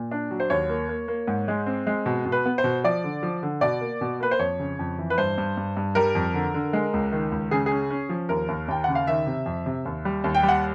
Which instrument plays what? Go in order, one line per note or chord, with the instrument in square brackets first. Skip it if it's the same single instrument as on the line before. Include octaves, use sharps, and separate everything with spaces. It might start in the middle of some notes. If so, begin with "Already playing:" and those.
Already playing: [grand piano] A#2
D4
F#3
C5
D#2 C#5
A#3
A#3
A#3
G#2
G#3
C4
G#3
B2
B2
B4
B3
C5
B2
F3 D5
D3
F3
D3
B2 D5
A#3
B2
A#3 B4
C5
F2 C#5
C#3
F2
E3
B4
G2 C5
G2
G2
G2
G3 A#4
F2
D3
D3
G#3
C#2
D#3
C#2
C#3 G#4
G#4
C#4
C#4
F3
D#2 A#4
D#2
D#2 G5
C#3 F#5
F5
D#3 E5
C3
F2
C3
D#2
G3
D#2
G5
G3
F#5